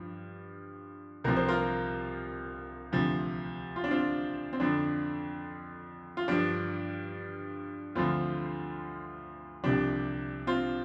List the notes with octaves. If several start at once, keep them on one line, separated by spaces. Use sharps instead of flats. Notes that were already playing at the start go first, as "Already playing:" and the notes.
Already playing: G2 F3
C2 C3 F3 A#4
C5
F4 A#4
D2 C3 F3
F4
D4
C4 F4
C4
F2 D3 F3 D4
F4
G2 F3 D4
D2 D3 F3 C4 F4
C2 C3 F3 D4 G4
C4 F4